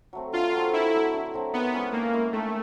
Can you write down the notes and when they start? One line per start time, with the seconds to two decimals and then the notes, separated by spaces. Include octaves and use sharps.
0.13 F#3 A3 C4
0.33 D3 F4
0.52 F#3 A3 C4
0.72 D3 E4
0.93 F#3 A3 C4
1.13 D3
1.34 F#3 A3 C4
1.54 D#3 B3
1.73 G#3 C#4 E4
1.93 D#3 A#3
2.13 G#3 C#4 E4
2.33 D#3 A3